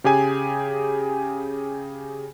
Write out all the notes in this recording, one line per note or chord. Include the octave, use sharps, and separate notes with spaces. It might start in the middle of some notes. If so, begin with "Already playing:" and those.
C#3 G4 G#4 G#5